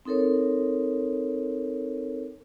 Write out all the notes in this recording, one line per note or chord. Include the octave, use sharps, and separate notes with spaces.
C4 D#4 A4 A#4 C#5